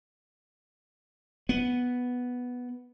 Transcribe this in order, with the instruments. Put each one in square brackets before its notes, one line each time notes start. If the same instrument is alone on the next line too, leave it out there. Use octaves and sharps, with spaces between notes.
[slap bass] B3